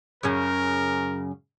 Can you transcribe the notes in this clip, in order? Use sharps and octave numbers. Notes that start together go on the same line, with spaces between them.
F#2 C#3 C#4 A#4